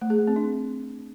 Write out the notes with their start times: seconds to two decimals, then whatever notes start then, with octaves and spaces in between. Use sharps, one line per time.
0.01 A3
0.10 G#4
0.19 A3
0.28 C4
0.36 D4